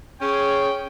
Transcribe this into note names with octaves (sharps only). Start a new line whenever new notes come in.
C#4 G#4 C#5 G5